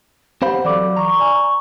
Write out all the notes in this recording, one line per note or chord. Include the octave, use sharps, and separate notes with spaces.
C4 G4 C5 F5 F#5 B5
E3 F#3 A4 D5 B5 D6
A#5 C#6
D5 G#5